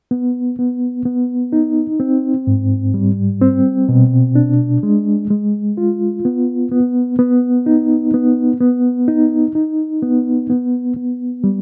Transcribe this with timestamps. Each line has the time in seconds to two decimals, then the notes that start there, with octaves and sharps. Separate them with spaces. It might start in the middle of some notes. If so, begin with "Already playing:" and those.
0.11 B3
0.59 B3
1.05 B3
1.52 D#4
2.00 C4
2.47 G#2
2.94 G3
3.42 C4
3.89 B2
4.35 D4
4.83 G#3
5.30 G#3
5.77 F4
6.25 B3
6.72 B3
7.19 B3
7.66 D#4
8.14 B3
8.60 B3
9.08 D#4
9.55 D#4
10.02 B3
10.50 B3
10.96 B3
11.44 G3